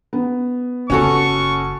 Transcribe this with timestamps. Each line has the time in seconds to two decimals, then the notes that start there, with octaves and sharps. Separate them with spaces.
0.13 B3
0.90 F#1 C#4 F#4 A4 C#6